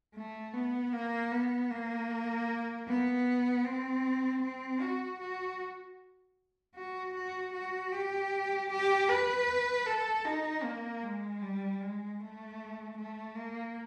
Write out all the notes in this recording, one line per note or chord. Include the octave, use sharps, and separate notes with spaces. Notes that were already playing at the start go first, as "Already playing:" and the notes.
A3
B3
A#3
B3
A#3
B3
C4
C4
F#4
F#4
F#4
F#4
F#4
G4
G4
B4
A4
D#4
A#3
G#3
G3
G#3
A3
A3
A#3